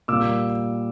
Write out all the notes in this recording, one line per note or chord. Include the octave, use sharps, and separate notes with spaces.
A#2 G3 D6 E6